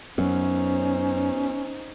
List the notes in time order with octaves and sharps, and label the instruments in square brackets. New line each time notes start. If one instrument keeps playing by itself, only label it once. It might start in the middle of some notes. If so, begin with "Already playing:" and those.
[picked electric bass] F#2 [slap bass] F#3 B3 [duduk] C#4 [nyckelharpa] D#4 C5